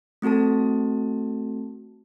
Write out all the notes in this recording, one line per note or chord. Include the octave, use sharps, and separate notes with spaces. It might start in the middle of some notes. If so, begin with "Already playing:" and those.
A3 C4 F#4 A4 A5